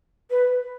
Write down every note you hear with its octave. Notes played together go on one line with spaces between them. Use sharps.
B4